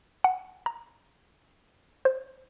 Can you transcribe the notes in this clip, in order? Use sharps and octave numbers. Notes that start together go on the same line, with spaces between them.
F#5
A#5
C5